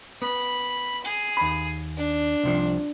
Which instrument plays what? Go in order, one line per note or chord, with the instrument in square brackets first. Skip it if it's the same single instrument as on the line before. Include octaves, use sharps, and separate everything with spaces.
[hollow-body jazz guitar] B3 [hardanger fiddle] B5
[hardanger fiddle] G#4
[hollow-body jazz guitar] D#2 B5
[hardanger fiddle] D4
[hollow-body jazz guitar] C2 C3 F3